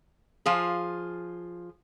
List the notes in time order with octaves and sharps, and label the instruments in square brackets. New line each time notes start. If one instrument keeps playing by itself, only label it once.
[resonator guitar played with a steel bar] F3 F4 G#4